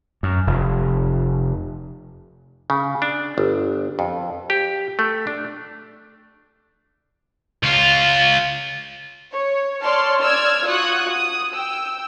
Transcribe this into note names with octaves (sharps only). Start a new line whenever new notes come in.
F#2
F1
C#3
D4
G1
F2
G4
A3
D4
C#2 F4
C#5
C#5 D5 A5 C6 F6
D5 E6 F6 G#6
F4 F#4 C#6 D#6 F#6 G#6
D#6
G5 E6